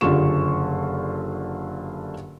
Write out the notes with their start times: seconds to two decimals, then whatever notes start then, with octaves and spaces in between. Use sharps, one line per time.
0.01 F#1 G2 D3 F4 C#6 E7